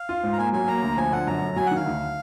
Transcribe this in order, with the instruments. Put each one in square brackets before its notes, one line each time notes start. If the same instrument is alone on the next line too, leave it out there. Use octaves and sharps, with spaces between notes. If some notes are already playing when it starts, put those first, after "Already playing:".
Already playing: [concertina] F5
[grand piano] F4
G#2
[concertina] A#5
[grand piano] A#3 [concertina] G#5
[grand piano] F#3 [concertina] G#5
[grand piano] A#3 [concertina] A#5
[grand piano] D2
[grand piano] F3 [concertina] G#5
[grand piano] D3 [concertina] F#5
[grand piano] F#2 [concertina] A#5
[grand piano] F#2
[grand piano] F#3 [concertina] G#5
[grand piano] D#3 [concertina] F#5
[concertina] F5
[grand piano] D2